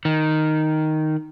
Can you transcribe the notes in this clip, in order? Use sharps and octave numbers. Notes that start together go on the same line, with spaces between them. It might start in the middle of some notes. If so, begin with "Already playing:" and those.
D#3